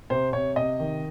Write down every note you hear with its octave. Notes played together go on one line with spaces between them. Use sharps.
C3 C5
C3 C#5
C3 D#5
D#3